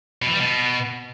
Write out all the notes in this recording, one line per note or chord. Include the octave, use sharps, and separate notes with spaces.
B2
E3
G3
B2